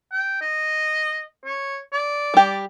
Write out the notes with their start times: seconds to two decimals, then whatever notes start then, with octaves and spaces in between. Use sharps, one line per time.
0.12 G5
0.41 D#5
1.45 C#5
1.93 D5
2.34 G3 G4